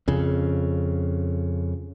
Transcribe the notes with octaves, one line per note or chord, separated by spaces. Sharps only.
F2 C#3